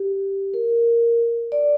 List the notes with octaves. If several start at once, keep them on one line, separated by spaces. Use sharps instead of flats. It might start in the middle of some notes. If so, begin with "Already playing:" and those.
Already playing: G4
A#4
D5